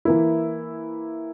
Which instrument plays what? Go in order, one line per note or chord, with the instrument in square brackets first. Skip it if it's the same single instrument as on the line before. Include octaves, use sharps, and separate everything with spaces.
[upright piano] E3 A#3 E4